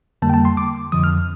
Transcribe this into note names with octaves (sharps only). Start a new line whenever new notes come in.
F2 D3 G3 A#3 A5
G5
A5
C6
D6
F2 D3 F3 D#6
F6